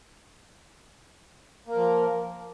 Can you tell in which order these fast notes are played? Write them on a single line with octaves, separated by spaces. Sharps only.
A#3 A#4 F3